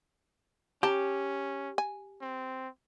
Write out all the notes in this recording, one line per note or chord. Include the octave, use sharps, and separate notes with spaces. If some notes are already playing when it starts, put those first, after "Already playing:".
C#4 G4 A5 A#5
G#5
C4